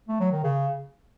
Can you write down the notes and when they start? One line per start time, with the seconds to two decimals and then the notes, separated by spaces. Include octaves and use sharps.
0.08 A3
0.20 F#3
0.32 D#3
0.44 C#3